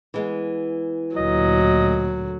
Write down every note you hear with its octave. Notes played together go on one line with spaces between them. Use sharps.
E3 G#3 B3
D2 A#2 F#3 D#5